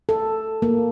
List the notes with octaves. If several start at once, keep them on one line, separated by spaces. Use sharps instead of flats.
A4
A#3